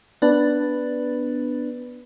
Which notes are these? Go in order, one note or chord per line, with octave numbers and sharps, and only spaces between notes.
B3 D4 B4